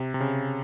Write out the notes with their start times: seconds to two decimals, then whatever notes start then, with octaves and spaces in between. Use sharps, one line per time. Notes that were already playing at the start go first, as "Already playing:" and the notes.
Already playing: C3
0.14 C3
0.21 C#3